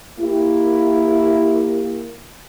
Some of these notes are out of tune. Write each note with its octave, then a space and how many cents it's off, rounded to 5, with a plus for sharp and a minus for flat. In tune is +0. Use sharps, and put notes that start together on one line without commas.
A#3 +0 E4 +0 G4 +20